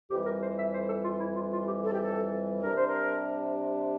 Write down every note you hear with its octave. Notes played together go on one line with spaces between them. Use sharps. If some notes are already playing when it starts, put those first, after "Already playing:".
F2 E3 G3 G4
A#4
C5
E5
C5
A4
F4
E4
F4
F4
G4
A4
G4
A4
C3 G3 D4 A#4
C5
A#4